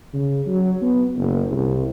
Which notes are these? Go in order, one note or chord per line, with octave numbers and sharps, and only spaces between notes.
C#3
F#3
B3
F#1
C2